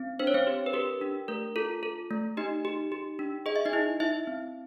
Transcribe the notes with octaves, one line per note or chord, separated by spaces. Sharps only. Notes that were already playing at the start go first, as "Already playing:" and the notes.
Already playing: C4
D4 C5
C#5
C4 C5
G4
B4
G4 A#4
D4
A3 A#4
F4 A4
A4
A3
D#4 G4 D#5
G4
G4
D4
G#4 D#5
E5
D#4 D#5
E4
E4 E5
C4